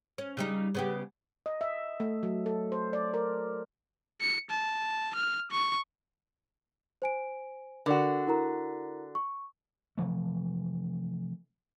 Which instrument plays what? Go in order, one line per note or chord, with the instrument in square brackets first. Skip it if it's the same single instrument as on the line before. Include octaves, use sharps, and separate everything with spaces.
[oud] C#4
C#3 G3 D#4
C#3 B3 G4
[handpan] D#5
E5
A3
F#3
A4
C5
D5
A#4
[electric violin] C#7
A5
F6
C#6
[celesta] C5 G#5 D7
[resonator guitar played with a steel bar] D3 F#4 [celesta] A#4 D5
[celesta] E4 A#4 A#5
C#6
[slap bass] C3 E3 F3 A3